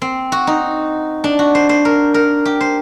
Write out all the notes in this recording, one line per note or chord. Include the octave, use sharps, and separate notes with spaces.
C4
F#4
D#4
D4
F#4
C5
C5
A#4
A#4
G4
C5